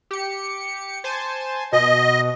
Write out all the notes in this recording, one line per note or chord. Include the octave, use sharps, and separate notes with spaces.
G4 C#7
C5 G#5 A5
B2 D#5